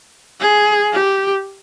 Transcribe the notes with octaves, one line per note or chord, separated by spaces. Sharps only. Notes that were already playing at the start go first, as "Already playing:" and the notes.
G#4
G4